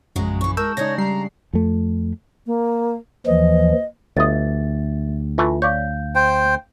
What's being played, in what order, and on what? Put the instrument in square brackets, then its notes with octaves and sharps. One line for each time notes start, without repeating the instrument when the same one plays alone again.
[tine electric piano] A#1 F#2 [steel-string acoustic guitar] C#3 F#3 G#3
[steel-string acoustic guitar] C#3 E3 [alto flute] C#6
[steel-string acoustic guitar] G#3 [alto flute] A#4 [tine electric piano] A5 C#6 G6 [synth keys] E6
[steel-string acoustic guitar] C#3 G#3 D4 [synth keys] D#4 A#6 [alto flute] C#5
[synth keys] G3 C7 [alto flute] A#5
[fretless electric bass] F2 A3
[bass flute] A#3
[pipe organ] D#2 E3 F3 [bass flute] D#5
[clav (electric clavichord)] G1 D#5 [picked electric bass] D2 [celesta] E5 A6
[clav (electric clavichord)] E3 A3 [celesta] F4
[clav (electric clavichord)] C#5 D5 [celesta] F5 G6
[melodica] C5 G5